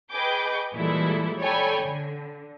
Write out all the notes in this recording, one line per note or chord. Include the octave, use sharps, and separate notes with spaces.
G#4 B4 D#5 G5 D6 G6
A#2 E3 G3 G#3 E4 A4
A4 C#5 D5 G5 G#5 B5
D3